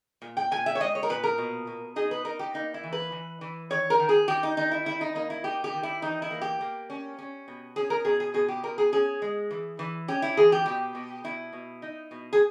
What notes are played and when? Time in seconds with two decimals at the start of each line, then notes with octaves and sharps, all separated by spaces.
0.22 A#2
0.37 G5
0.51 A#2 G#5
0.66 E5
0.75 C#5
0.80 G#3 D#5
0.95 C#5
1.03 A#4
1.09 A#2 B4
1.24 A#4
1.38 B2
1.67 B2
1.96 D#4 G#4
2.11 B4
2.25 D#4 A#4
2.39 G4
2.54 A#3 D#4
2.74 E4
2.83 E3
2.93 B4
3.12 E3
3.41 E3
3.70 D#3 C#5
3.90 A#4
3.99 D#3
4.09 G#4
4.28 D#3 G4
4.43 D#4
4.57 D#3 D#4
4.71 E4
4.86 D#3 E4
5.01 D#4
5.15 A#3 D#4
5.30 E4
5.44 D#4 G4
5.64 G4
5.73 D#3
5.83 E4
6.02 E3 D#4
6.22 E4
6.31 A#3
6.41 G4
6.61 A#3
6.90 C#4
7.19 C#4
7.48 B2
7.76 C#4 G#4
7.90 A#4
8.05 B2 G#4
8.20 G#4
8.34 B2 G#4
8.48 G4
8.63 B2 A#4
8.78 G#4
8.92 C#4 G#4
9.22 G#3
9.51 E3
9.79 E3
10.08 C#4 G4
10.22 E4
10.37 E3 G#4
10.52 G4
10.66 B2 G4
10.95 B2
11.24 B2 E4
11.53 B2
11.82 D#4
12.11 B2
12.33 G#4